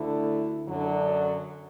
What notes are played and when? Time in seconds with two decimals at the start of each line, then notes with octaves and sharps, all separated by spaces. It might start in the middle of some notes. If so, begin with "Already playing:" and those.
Already playing: D2 D3 A3 E4
0.67 F#2 D3 F#3